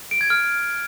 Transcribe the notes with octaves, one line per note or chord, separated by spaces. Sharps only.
D7
G#6
F6